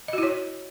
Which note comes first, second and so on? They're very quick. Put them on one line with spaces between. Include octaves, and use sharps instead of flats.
D#5 F#4 E4 C#5